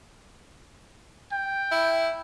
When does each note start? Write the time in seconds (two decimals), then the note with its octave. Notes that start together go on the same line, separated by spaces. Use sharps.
1.32 G5
1.72 E4